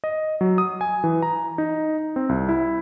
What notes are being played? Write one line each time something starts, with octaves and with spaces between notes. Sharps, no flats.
D#5
F#3
D#6
G#5
E3
A#5
D#4
C4
C2
E4